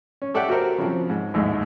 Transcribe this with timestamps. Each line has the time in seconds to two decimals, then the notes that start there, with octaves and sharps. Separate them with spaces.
0.22 C#4
0.34 G4 A4 D5 E5 F#5 G5
0.49 F#4 G4 A#4 C5
0.78 C#3 F3 C4
1.10 G#2
1.34 A1 D#2 G#2